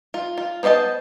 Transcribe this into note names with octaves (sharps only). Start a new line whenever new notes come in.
F4
F4
B3 C5 D5 D#5 A5